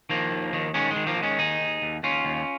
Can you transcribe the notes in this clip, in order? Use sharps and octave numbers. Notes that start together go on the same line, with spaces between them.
D#3 F3 A#3
D#2
D#3
D#3 G#3 C#4
G#3
D#3
F3 A#3
D#3
G#3 C#4
D#2 D#4 G#4
D#2
D#2
D#2 C#4 F4
D#2